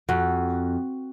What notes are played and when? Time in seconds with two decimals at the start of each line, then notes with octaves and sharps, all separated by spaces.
0.09 F2 F#4